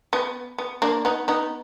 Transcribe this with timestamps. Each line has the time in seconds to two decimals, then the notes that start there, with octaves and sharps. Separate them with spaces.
0.13 B3
0.58 B3
0.82 A#3 D4
1.05 B3 D#4
1.28 B3 D#4